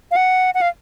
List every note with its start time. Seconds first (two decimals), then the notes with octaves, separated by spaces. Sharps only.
0.11 F5
0.16 F#5
0.55 F#5
0.61 F5